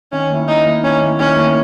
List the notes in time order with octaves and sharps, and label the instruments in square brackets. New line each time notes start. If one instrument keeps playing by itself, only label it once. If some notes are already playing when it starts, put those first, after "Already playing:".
[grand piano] D#3 [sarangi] C#4
[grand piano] A#3 E4
[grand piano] D#3 [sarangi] D#4
[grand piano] A#3 E4
[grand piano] D#3 [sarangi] C#4
[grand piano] A#3 E4
[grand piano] D#3 [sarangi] C#4
[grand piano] A#3 E4